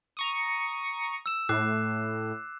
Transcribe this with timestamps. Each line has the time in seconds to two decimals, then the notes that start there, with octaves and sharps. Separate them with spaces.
0.17 A#5 C#6 D#6
1.26 E6 E7
1.49 A2 D6 F#6 C7